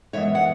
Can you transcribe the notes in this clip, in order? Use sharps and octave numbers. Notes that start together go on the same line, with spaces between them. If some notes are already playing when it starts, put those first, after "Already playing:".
F#2 E3 G#3 B3 C#5 E5
F#5